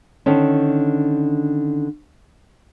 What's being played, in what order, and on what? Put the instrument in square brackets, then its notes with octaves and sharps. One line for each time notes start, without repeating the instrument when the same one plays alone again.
[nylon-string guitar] D3 D#3 C#4